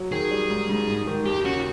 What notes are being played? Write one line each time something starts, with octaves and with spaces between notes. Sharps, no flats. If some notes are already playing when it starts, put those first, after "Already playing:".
Already playing: F#3
D#3 G#4
G3
G#2
G#2
G#2
D#3
D#2 G4
C#3 F#4